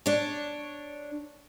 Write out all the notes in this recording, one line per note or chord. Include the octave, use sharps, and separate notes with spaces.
D4 C#5